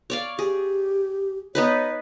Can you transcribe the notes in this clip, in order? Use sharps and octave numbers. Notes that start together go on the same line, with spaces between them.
C#5 D5 F5
G4 G#4
B3 D#4 B4 C#5